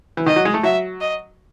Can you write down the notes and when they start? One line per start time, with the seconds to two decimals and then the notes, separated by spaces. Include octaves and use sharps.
0.17 E3
0.26 D#3 D#5
0.36 F#3
0.45 G#3
0.54 A3
0.63 F#3 E5
1.01 D#5